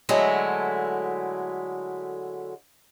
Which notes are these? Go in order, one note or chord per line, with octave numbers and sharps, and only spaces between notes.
D3 F#3 G#3 A3 E4